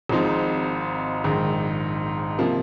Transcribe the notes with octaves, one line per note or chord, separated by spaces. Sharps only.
G#1 G#2 F3 C4 D#4
A#1 G#2 D#3
C3 F3 A#3